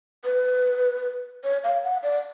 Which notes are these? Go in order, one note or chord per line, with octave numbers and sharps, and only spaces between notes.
B4
C#5
F5
F#5
D5